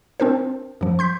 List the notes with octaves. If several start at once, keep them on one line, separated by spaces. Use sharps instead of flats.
C4 D4 A#4 C5
F#2 F3
C6 G6 B6